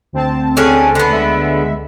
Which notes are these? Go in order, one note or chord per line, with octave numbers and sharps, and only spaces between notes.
D2 C4 A5
D3 C#4 G#4
D3 B3
D2 G#3 E5